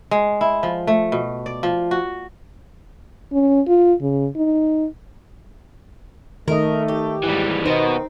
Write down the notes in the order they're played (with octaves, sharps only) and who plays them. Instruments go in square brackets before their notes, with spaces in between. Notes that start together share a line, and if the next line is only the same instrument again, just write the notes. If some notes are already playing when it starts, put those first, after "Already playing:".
[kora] G#3
E4
F3
A3
B2
D5
F3
F#4
[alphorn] C#4
F4
C#3
D#4
[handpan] D#3 D#5 [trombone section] A3 [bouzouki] A#4
[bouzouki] G4
[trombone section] G#2 [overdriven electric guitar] E3 G3
[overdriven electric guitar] B2 B3 [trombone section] D#3 [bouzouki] C4 [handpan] D#4